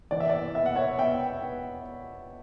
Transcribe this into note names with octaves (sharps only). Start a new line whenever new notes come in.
E3 D5
E5
D5
B3 E5
F#5
C#5 E5
B3 E5 G5
B3